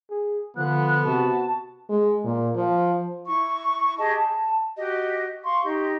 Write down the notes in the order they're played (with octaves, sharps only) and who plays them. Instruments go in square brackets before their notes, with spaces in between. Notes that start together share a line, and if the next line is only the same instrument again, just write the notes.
[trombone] G#4
[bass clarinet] D3 [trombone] F3 [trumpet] B3 [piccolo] F#6
[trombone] C3 [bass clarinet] F#4 [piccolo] A5
[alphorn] G#3
A#2
F3
[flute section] E4 C#6
G4 G#4 D#5 A5
A5
F#4 G4 D#5
F5 C6 C#6
D#4 G4 D#5